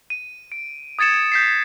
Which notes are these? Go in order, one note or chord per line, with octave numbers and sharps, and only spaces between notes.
D#7
D7
D#6 G#6 A6 C#7 E7
G6 B6 C7